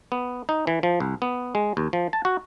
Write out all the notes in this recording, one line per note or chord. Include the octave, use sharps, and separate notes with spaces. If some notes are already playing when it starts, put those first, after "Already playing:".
B3
D#4
E3
F3
C2
B3
G#3
D#2
F3
A5
F#4